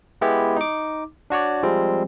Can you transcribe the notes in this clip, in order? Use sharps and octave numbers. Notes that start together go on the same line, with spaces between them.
G#3 B3 E4 G4
D#4 D6
D4 F#4 C#5 D5
F3 G3 G#3 C4